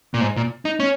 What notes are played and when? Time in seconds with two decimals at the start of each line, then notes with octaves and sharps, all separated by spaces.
0.14 A#2
0.21 G#2
0.36 A#2
0.65 D#4
0.80 C#4